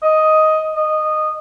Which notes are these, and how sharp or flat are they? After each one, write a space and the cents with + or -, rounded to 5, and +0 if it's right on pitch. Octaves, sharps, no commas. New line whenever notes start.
D#5 +5
D#5 -15